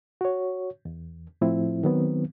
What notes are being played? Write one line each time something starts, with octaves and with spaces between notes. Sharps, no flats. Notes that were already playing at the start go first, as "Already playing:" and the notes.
F#4 C#5
E2
A2 F3 A3 C4 E4
D#3 F#3 B3 C4